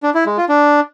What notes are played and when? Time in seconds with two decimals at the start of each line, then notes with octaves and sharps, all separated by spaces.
0.03 D4
0.15 E4
0.26 G#3
0.38 F4
0.49 D4